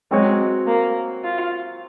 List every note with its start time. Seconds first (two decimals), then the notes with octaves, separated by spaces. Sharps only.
0.11 F#3 G#3 C4 F#4 C#5
0.67 A#3
1.24 F4